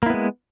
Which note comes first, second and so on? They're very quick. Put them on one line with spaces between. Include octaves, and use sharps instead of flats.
A#3 E4 B3 G#3